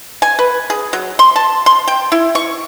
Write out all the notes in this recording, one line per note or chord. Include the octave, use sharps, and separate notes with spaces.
G#5
B4
G#4
F#3
C6
A5
C6
G5
E4
C#6